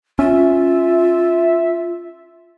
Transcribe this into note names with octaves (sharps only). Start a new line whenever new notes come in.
C#4 F4 E5